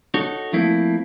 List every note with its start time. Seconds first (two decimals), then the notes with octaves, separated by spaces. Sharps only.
0.14 D#4 F#4 A4 C#5
0.53 F3 A3 A#3 C4 E4